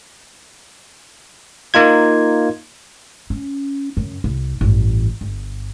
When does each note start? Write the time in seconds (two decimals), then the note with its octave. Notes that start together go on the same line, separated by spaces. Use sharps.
1.74 A#3 D#4 F4 G#6
3.30 C#4
3.97 F#2 C#3
4.24 C2
4.61 A1 G2
5.21 G1